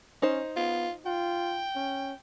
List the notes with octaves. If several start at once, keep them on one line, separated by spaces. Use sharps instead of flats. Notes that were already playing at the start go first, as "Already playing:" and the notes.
C#4 D#4 C5
B3 F4
F4 G5
C#4